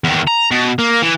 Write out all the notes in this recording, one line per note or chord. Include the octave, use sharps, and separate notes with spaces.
E2 D#3
A#5
B2
A#3
E3